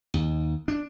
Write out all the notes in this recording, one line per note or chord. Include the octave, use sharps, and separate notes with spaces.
D#2
D4